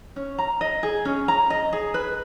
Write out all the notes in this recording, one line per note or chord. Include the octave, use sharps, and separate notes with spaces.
C#4
A#5
D#5
G#4
C#4
A#5
D#5
G#4
B4